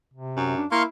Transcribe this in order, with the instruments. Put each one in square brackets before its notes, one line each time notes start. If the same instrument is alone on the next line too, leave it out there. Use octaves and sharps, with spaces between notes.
[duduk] C3
[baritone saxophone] F#2
[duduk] D4
[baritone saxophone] A#3 [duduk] E4 [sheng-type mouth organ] F5 C6 C#6